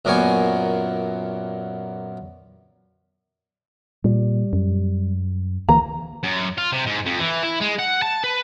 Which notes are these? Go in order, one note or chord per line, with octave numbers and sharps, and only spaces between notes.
F#2 A#2 A#3 B3 G#5 C#6
A#2 G3
F#2
D2 E3 A#3 A#5
F#2
F4
C3
G#2
F2
E3
E4
G#3
F#5
A5
B4